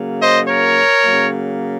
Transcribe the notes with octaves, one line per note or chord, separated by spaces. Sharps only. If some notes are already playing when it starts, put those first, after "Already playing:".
Already playing: C#3 F#3 A#3
C5 D#5
A#4 C#5
C#3 F#3 A#3